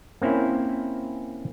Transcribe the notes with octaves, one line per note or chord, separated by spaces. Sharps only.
A#3 C4 C#4 E4